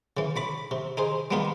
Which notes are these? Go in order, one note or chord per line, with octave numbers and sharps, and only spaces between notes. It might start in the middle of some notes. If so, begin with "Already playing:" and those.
C#3 E3
B1 B5 D6
C3
D#4 G#4 C5
G3 G#3 B3 D#4 F4 G4